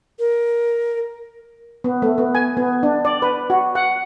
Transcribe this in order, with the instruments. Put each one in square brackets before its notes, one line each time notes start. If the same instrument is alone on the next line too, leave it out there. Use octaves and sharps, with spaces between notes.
[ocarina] A#4
[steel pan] B3
A3
B3
G#5
B3
D4
D5
B4
F#4
F#5